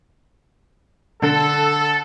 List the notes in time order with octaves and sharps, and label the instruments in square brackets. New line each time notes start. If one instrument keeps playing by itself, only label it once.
[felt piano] D3 [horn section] A4